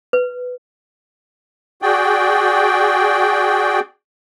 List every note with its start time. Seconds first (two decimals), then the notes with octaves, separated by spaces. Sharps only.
0.13 B4
1.82 F#4 G#4 D5 G5